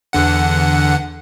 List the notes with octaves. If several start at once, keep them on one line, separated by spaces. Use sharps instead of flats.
E2 D3 F#5